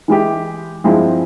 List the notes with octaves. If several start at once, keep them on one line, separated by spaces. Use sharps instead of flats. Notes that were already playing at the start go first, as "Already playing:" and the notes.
E3 G#3 E4 G4
G2 F3 G#3 C4 E4